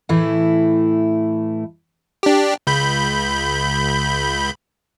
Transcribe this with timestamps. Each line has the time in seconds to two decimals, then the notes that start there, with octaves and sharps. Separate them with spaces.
0.09 A2 E3 A3 E4
2.23 D4 G4
2.67 C#2 B5 G6